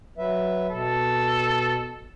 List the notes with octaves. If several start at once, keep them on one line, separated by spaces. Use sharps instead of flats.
F#3 B4 E5
B2 A4